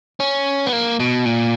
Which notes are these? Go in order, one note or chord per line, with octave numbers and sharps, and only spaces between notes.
C#4
B3
A#3
B2
A#2